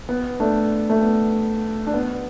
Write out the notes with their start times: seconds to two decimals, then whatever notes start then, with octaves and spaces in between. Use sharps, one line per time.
0.09 B3
0.40 A3 D4
0.90 A3
1.01 B3
1.87 D4
1.94 B3